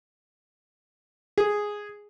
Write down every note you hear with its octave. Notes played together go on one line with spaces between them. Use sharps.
G#4